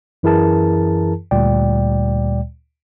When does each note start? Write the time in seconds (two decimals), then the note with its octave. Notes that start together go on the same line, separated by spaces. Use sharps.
0.23 F#2 E3 E4 G#4 A#4 A5
1.31 D2 A#2 G3 D5 G5